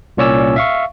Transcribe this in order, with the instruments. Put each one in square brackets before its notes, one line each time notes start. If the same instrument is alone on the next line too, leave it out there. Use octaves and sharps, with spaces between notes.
[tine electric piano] C2 A#2 C#4 C#5 D5 E6
E5 F5 C#6